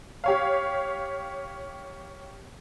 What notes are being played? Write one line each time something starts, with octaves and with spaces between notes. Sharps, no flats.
G4 C#5 F5